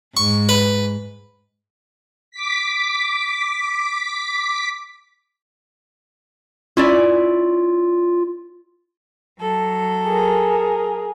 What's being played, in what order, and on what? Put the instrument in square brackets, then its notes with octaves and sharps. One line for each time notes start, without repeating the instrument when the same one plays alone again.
[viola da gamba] G#2 [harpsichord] C#6
[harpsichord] B4
[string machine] D6 B6
[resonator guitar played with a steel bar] C#4 E4 D5 [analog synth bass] F4
[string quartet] F#3 A4
[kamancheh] G#4 A#4